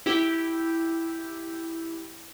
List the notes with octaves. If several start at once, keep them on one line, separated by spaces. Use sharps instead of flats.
E4 G4